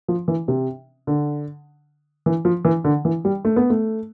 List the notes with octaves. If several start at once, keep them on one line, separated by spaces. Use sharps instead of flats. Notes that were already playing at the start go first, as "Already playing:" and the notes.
F3
E3
C3
D3
E3
F3
E3
D3
E3
G3
A3
B3
A3